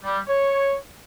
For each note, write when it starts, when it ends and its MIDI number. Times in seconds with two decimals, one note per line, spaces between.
0.04 0.18 55
0.27 0.74 73